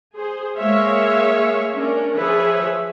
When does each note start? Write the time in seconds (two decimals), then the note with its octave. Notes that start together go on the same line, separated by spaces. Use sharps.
0.15 G#4 C5
0.58 G#3 A#3 C#5 E5 F5
1.74 C#4 D4 A#4
2.14 F3 G#4 B4 C#5 E5